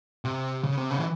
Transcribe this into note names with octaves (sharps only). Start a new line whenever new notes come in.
C3
C#3
C3
C#3
E3